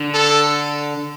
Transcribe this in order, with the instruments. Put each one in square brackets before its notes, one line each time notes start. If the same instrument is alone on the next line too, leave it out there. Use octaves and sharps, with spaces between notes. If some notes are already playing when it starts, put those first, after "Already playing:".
Already playing: [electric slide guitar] D3
[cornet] A4